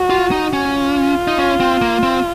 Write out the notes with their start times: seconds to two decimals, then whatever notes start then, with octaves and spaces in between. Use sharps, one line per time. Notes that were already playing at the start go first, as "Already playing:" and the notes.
Already playing: F#4
0.10 F4
0.31 D#4
0.53 C#4
0.74 F4
1.28 D#4
1.38 C#4
1.60 C4
1.82 A#3
2.03 C4